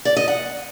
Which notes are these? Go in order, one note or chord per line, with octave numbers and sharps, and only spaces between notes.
D5
D#5
F#5